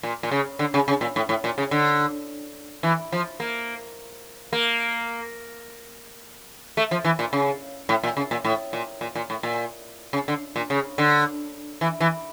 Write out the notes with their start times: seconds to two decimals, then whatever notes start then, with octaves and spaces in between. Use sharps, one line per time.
0.03 A#2
0.23 A#2
0.31 C#3
0.59 D3
0.74 C#3
0.88 C#3
1.01 A#2
1.16 A2
1.29 A2
1.44 A#2
1.58 C#3
1.71 D3
2.83 E3
3.12 F3
3.40 A#3
4.53 A#3
6.77 A3
6.91 F3
7.05 E3
7.19 A#2
7.33 C#3
7.89 A2
8.03 A#2
8.17 C#3
8.31 A#2
8.45 A2
8.73 A#2
9.01 A#2
9.15 A#2
9.30 A2
9.43 A#2
10.13 C#3
10.28 D3
10.56 A#2
10.70 C#3
10.98 D3
11.81 E3
12.00 E3